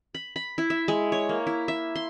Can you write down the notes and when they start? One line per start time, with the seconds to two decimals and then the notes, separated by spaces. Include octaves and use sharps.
0.14 B5
0.36 B5
0.58 E4
0.70 E5
0.88 G#3
1.12 C#5
1.29 A#3
1.47 E4
1.68 E5
1.96 C6